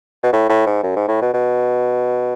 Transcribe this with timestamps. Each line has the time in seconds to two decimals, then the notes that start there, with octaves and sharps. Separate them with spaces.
0.23 B2
0.33 A2
0.49 A2
0.66 G#2
0.83 F#2
0.96 G#2
1.08 A2
1.22 B2
1.34 B2